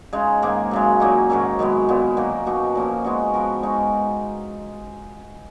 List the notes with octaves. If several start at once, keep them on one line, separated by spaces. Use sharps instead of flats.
C#3 G#3 D#4
G#2 D#3 A#3
F#2 C#3 G#3
A#2 F#3 A#3 D#4
G#2 D#3 F#3 C#4
F#2 D#3 G#3 B3
A#2 G#3 B3
D#3 F#3 A#3
B2 A#3 D#4 F#4
A#2 F3 A#3 C#4
G#3 B3 D#4 F#4
F3 B3 F#4 A#4
G#3 D#4 F#4